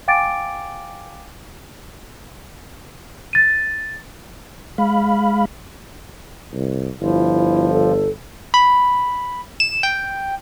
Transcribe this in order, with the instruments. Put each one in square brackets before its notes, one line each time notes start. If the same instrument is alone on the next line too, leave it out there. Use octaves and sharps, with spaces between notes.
[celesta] F5 G5 G#5 D6 A6 D7
A6 D#7
[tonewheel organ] G#3 F5 B5
[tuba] C2
[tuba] G1 [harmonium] F3 [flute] E4
[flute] A4
[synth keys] B5
E7
G5